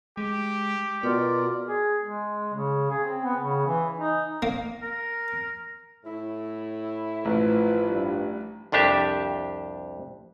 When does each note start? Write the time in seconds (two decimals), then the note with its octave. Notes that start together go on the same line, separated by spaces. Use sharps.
0.17 G#3 G4
1.03 B2 B3 F4 A#4 D5
1.67 G#4
2.03 G#3
2.54 C#3
2.90 G#4
3.04 C4
3.24 B3
3.40 C#3
3.67 E3
3.97 D#4
4.42 A#3
4.82 A#4
6.05 A2 E4
7.25 A1 F3 B4
7.88 G2
8.72 C2 F2 D4 G4 E5